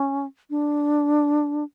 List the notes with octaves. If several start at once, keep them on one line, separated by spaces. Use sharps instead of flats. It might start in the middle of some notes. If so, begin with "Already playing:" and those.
Already playing: C#4
D4